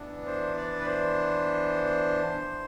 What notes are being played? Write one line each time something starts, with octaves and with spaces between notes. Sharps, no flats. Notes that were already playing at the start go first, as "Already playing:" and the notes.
Already playing: E3 B3 D4
C5
D5
B4
C5